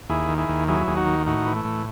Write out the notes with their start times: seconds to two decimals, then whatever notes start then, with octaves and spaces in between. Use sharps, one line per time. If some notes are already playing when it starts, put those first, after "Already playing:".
0.09 D#2 E4 G#4
0.29 D#3
0.38 E4 G#4
0.49 D#2
0.68 F#3 E4 G#4
0.87 D#2 G#4
0.97 D#4 F#4
1.06 D#3
1.27 A2 D#4 F#4
1.46 E3
1.56 A3
1.65 A2